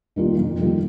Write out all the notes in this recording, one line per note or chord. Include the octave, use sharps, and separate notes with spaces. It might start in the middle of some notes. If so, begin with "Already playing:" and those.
D#3 G3 A#3 F4
F2
D#3 G3 A#3 F4